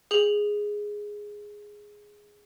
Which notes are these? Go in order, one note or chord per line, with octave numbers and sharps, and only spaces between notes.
G#4 F#7